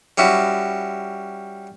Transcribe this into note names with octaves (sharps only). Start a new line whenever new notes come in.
G3 C#4 E4 F#4